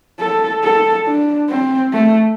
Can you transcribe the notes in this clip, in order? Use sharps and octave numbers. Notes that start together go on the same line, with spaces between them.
A4
A4
D4
C4
A3